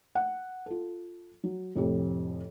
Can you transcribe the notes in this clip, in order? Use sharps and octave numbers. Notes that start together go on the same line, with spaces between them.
F#5
F4 A4
F#3
F1 F2 A2 G4